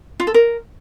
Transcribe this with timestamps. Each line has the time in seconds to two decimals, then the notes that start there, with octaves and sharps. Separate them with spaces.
0.20 F4
0.27 A4
0.34 A#4